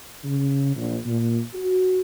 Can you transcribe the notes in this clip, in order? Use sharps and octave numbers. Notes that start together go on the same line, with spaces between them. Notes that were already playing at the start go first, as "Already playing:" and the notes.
C#3
A#1
A#2
F#4